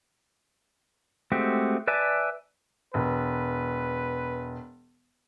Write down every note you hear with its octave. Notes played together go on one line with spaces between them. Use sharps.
G#3 A3 C4 F#4 G4
B4 D5 E5 G#5 A5
E1 B4